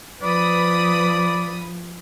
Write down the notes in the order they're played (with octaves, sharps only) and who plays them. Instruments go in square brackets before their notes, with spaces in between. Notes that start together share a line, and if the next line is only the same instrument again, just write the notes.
[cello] F3 [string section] B4 B5 D#6 [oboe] D5